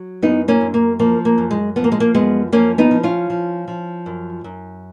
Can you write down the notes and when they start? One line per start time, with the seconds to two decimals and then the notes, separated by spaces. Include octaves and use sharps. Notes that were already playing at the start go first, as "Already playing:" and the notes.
Already playing: F#3
0.22 F#2 B3 D#4
0.48 A#3 C#4
0.61 F#2
0.74 A#3
0.99 F3 A#3
1.25 A#3
1.38 F#2
1.51 G#3
1.76 F3 B3
1.84 A#3
1.92 G#3
2.00 A#3
2.14 F#2 G#3 B3
2.52 F3 A#3 C#4
2.78 B3 D#4
2.91 F3
3.03 C#4 F4
3.30 F3
3.68 F3
4.06 F#2
4.44 F#2